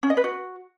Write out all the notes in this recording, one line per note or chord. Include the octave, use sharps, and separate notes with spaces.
C#4
D#5
B4
F#4